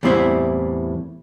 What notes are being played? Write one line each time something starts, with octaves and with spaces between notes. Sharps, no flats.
E2 A2 G3 C4 E4 E5